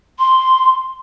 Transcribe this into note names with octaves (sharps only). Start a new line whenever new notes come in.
C6